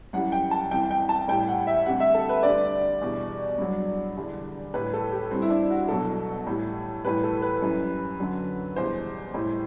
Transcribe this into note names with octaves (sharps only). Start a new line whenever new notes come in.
F#2 E3 G3 F#5
G5
A5
C2 C3 E3 G5
G5
A5
A2 E3 G3 G5
F#5
E5
D2 C3 G3 F#5
E5
A4
B4
D2 D3 G3 D5
E2 B2 G3
G2 F#3
E2 D3 G3
A2 E3 G3 B4
A4
G4
G2 E3 G3 C4
E4
D4
F#4
C2 B2 F#3 A4
A2 E3 G3
A2 E3 G3 B4
A4
B4
F#2 E3 G3
F#2 D3 F#3
E2 B2 G3 C5
A2 E3 G3